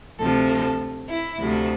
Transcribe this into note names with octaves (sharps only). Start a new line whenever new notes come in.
D2 C3 F3 A4
A4
E4
D2 C3 F3